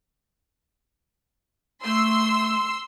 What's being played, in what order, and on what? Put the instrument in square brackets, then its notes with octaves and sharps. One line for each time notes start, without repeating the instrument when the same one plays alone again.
[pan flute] A3 [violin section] C6 E6